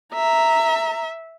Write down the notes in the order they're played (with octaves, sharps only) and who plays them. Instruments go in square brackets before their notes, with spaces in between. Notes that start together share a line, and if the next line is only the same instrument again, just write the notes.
[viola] E5 [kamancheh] A#5